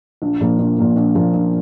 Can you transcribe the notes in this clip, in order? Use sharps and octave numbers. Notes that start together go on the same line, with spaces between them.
A#1
A#2 F3 A#3
A#1
A#2 F3 A#3
A#1
A#2 F3 A#3
A#1